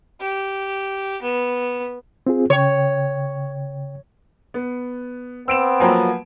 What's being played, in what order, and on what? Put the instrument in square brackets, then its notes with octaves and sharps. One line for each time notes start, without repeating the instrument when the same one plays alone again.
[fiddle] G4
B3
[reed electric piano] C4 F4 G#4
[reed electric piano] C#3 G5 [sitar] C#5
[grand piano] B3
[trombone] B3 [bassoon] C4 [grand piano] E6 D7 E7
[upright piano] F3 F#3 A#3 [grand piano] G#5 B5